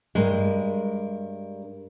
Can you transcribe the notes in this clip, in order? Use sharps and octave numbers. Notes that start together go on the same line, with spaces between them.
G2 G#3 A#4